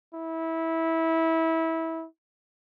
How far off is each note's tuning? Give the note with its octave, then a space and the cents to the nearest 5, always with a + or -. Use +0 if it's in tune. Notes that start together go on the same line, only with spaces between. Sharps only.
E4 -20